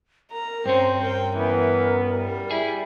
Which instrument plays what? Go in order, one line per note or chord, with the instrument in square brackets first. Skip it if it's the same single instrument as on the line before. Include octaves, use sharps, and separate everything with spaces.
[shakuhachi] A#4 [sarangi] A#5
[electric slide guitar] G2 C#4 [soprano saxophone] C4 [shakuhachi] C5
[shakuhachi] A#4 [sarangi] G5
[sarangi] E3 [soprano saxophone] B3
[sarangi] G3
[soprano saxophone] E4 [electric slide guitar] G#4